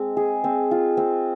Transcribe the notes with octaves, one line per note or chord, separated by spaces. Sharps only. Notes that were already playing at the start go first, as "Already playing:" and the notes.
Already playing: G#3 C4
G#4
C4
F4
C4